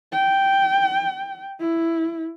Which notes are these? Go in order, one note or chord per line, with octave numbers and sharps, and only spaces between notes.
G5
E4